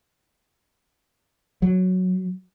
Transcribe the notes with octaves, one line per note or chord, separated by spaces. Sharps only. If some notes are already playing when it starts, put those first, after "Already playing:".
F#3